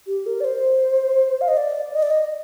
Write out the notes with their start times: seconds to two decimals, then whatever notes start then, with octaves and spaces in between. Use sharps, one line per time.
0.07 G4
0.26 A#4
0.40 D5
0.44 C5
1.41 F5
1.48 D#5
1.57 D5
1.94 D#5
2.03 D5
2.10 D#5